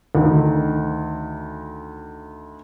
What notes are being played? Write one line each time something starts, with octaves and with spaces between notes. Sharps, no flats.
D2 D#3